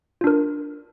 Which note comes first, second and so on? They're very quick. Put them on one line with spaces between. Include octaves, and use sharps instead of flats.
F4 D4 A#4